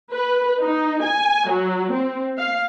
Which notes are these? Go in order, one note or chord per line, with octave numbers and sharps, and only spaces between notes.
B4
D#4
G#5
F#3
C4
F5